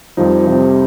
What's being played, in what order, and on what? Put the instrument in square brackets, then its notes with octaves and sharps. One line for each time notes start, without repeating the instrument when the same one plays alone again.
[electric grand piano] F2 D#3 G3 D#4 [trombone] F3
[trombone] C3